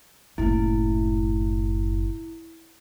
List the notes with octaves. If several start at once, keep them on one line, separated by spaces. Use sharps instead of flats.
F#1 A2 E4